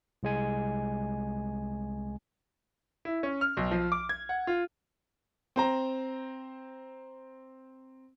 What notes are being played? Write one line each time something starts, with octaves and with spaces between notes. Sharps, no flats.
C2 G#3 G#5
E4
C#4
F6
B1
F3
D6
G#6
F#5
F4
C4 C5 A#5